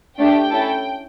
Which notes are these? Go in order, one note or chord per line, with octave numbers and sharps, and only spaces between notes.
A3 D4 G4 G5
C#4 E4 A4